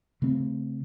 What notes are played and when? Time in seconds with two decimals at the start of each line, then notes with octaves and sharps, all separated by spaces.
0.22 C#3 A3 C4